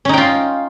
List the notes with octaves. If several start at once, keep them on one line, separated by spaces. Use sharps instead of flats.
C#4 D#4 F4 G5